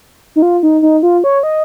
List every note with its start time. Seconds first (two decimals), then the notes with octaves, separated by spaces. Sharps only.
0.36 D#4
0.42 F4
0.63 D#4
0.82 D#4
1.03 F4
1.24 C#5
1.43 D#5